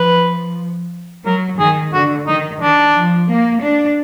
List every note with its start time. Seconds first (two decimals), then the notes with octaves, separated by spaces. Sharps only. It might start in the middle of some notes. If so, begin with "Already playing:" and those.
Already playing: F3 B4
1.25 F#3 A#4
1.60 D#3 G#4
1.93 D3 F#4
2.27 D#3 D#4
2.61 D#3 D4
2.95 F3
3.29 A#3
3.63 D4